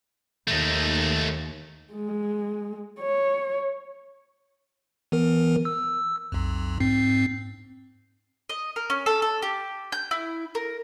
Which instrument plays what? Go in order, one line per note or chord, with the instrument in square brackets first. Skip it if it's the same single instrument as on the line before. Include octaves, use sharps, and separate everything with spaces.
[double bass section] D#2 [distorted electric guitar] A3 D#4
[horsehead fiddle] G#3
C#5
[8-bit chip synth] E3 B3 A#4
E6
B1 F2
G#2 C4 C7
[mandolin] D#5
A#4
C#4
A4
A4
G4
G6
E4
A#4